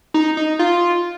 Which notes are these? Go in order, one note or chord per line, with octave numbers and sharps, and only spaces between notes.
D#4
D#4
F4